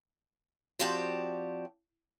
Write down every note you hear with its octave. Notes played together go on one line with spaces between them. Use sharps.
F3 C4 F#4 G4 D5 A5